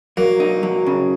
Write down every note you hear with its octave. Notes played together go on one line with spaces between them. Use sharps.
F#3 A#3
D#4
F#3
C#3